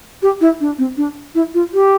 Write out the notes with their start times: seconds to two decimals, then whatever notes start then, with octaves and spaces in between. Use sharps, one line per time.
0.22 G4
0.41 E4
0.61 D4
0.78 C4
0.97 D4
1.35 E4
1.54 F4
1.73 G4